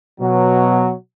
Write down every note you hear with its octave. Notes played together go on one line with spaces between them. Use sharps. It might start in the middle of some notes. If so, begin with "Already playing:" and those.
B2 F#3